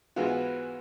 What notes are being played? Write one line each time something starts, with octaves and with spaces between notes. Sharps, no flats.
G#2 E3 G#3 B3 F4 F#4